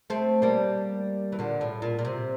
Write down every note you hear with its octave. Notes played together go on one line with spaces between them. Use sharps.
A3 C4
G3 A#3
E3
A#2 D3
A2
A#2
A#2
C3